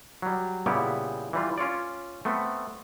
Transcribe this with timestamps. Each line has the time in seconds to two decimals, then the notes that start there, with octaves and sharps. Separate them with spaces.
0.22 F#3 G3
0.66 A#2 C#3 G3 B3 E4 G4
1.33 E3 G3 F4
1.58 C#4 F4 C#5 D5
2.25 A3 B3 C4